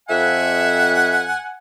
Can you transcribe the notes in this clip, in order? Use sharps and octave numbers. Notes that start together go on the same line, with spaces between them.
F2 E5 F#5 G#5